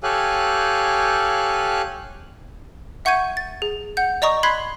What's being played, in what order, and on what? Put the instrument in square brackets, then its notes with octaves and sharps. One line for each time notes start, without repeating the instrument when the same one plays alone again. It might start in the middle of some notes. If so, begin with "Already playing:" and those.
[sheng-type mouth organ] G4 A4 C#5 F5 G#5 F#6
[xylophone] E5 F#5 C#6 G6 G#6 D#7
A6
G#4
F#5 G6
D5 D#5 A#5 C#6 D#6
B5 C6 F#6 G#6 B6 C7